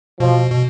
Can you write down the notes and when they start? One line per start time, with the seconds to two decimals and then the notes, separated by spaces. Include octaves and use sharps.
0.20 B2 F3
0.51 B2